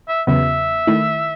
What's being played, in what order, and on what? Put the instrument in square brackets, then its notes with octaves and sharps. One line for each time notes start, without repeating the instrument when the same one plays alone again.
[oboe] E5
[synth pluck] E2 C#3 F#3 B3 [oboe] E5
[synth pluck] D#3 A3 E4